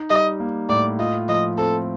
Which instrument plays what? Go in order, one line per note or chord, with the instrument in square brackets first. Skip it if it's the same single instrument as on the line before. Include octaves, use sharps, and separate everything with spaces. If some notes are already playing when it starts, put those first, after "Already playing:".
Already playing: [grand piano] D#4
[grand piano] G3 [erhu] D#5
[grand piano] A#3
[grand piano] A2 [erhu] D5
[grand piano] F4 [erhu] D#5
[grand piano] F3 [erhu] D#5
[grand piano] C4 [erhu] A4